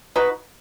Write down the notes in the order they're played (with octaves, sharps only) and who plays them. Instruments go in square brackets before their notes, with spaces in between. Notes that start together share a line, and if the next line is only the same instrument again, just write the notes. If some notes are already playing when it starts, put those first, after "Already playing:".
[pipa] D#4 F#4 B4